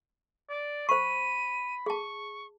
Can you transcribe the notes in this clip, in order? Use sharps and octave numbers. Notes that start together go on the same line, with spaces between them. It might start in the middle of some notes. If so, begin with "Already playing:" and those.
D5
C5 B5 C#6 D#7
G#4 A5 C#6